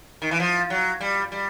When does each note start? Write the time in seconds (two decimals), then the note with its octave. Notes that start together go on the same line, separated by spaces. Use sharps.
0.22 D#3
0.31 E3
0.40 F3
0.70 F#3
1.01 G3
1.32 G3